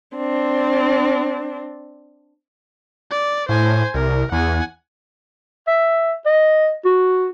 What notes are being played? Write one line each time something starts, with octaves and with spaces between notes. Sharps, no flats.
C4 D4
D5
A2 C5 G#5
C2 A#4
E2 F#5 G#5
E5
D#5
F#4